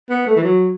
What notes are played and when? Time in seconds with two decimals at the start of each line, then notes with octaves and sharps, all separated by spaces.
0.10 B3
0.27 A3
0.36 E3
0.44 F#3